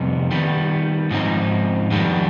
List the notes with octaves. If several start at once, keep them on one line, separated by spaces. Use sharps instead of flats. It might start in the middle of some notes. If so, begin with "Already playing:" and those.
Already playing: F2 C3 G3 B3 D#4
D#3 G3 B3
G#2 F3 C4 D#4
F2 D#3 G3 B3